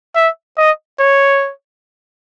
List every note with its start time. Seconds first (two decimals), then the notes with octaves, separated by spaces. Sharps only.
0.15 E5
0.58 D#5
1.00 C#5